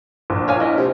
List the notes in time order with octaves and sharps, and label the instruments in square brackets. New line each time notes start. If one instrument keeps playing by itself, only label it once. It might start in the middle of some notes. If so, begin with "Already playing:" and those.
[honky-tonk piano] A#1
[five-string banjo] C#5 F5 G#5
E4 D#5
[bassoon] C3